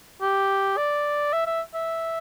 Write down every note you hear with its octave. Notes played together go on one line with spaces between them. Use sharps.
G4
D5
E5
E5
E5